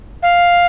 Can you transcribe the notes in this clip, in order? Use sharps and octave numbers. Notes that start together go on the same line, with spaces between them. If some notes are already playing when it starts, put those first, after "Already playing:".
F5